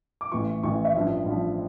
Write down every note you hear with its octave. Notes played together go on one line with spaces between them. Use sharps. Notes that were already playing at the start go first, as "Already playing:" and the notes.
D6
A1 A2 E3 C#6
A1 A2 E3 C#6
E5
A1 G2 F3
A1 G2 F3